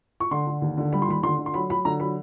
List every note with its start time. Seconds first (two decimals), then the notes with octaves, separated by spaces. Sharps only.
0.20 C#6
0.31 D3 C6
0.47 D3
0.62 D#2
0.77 D3
0.93 G3 B5
1.02 C6
1.08 D#2 B5
1.23 D3 C6
1.39 D3
1.46 C6
1.54 F#3 B5
1.70 F#3 B5
1.85 D3 A#5
2.00 F#3 B5